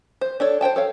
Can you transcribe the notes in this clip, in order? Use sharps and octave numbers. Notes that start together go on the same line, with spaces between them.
C5
D4 A4 C#5
C5 C#5 G5 A5
A4 C#5 F5